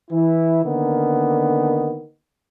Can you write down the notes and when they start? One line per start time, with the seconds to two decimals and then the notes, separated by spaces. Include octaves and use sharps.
0.11 E3 E4
0.65 D3 D#3 A#3 B3